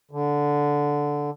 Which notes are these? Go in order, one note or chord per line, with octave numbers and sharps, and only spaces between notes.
D3